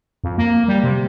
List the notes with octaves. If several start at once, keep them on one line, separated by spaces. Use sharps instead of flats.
F2
A#3
G3
C3